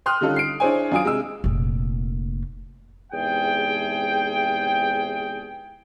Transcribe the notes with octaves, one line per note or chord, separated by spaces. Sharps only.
G5 C6 D#6 F6 F#6
D3 G3 C#4 D#4 F4 A4
C7 D7
D4 E4 G#4 C5 C#5 G#5
F#2 D4 F4 G#5 D#6 D7
C3 G#3 G#4 E6
F1 A#2
E2 G#2 C3 G#4 G5